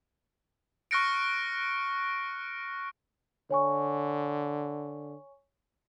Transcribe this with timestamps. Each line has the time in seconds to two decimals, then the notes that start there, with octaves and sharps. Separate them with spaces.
0.91 C#6 F6 F#6 A#6 C#7 D7
3.51 D3 C#5 G#5 C#6